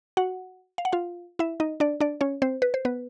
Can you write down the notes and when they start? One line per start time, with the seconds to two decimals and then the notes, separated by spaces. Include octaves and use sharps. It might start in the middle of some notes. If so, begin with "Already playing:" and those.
0.17 F#4 F#5
0.78 F5
0.85 F#5
0.92 F4 F5
1.39 E4 E5
1.60 D#4 D#5
1.80 D4 D5
2.01 D4 D5
2.21 C#4 C#5
2.42 C4 C5
2.62 B4
2.74 C5
2.85 B3 B4